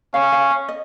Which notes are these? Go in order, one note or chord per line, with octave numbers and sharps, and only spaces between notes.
C#4 F5
F5
F5
D#5